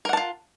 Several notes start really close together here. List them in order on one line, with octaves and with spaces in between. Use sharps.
A#4 F#5 A5 F4